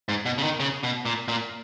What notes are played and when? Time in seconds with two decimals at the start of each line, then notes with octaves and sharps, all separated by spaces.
0.09 G#2
0.26 B2
0.38 C#3
0.43 D#3
0.60 C#3
0.83 B2
1.06 A#2
1.28 A#2